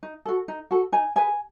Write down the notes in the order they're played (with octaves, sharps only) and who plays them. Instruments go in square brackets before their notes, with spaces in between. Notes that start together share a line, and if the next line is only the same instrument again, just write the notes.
[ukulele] D#4
F#4 A4
D#4
F#4 A4
D#4 G#5
G#4 B4 G#5